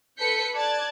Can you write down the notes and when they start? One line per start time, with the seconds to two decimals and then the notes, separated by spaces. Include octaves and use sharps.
0.19 A4 B4 G6 B6 C#7
0.54 D5 A5 F#6 G#6 A6